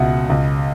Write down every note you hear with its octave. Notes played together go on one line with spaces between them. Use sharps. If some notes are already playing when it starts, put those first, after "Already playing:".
Already playing: C#2 B2 E5 F#5
C#2